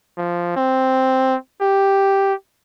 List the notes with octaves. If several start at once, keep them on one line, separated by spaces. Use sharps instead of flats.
F3
C4
G4